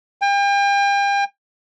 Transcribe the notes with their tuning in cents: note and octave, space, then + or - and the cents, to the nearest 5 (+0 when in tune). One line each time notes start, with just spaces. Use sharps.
G5 +40